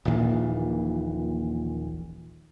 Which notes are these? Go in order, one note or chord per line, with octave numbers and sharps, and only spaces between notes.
D#1 A#1 A#2 E3